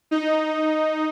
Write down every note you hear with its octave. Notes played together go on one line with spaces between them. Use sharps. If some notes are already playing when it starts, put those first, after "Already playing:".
D#4